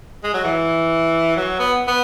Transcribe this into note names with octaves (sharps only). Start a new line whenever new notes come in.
G#3
F#3
E3
F#3
B3
B3